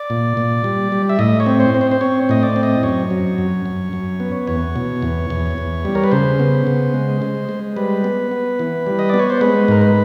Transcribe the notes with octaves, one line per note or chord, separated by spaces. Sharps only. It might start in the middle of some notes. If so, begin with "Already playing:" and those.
Already playing: D5
A#2
A#2
G3
G3
E5
A2 D#5
C#5
C4
C5
C4
C5
C5
C4 C#5
A2 D#5
D5
C4
D#5
F#2 C#5
F#3
F#2
F#2
F#2
B3
E2 C#5
B2
E2
E2
E2
G3
A#4
B4
C#3 C5
B3
C#3
G#3
G#3
G#3
G3 B4
B3
B3
E3
G3
D#5
B3 D5
C#5
C5
G#3 B4
G#2 A#4
B4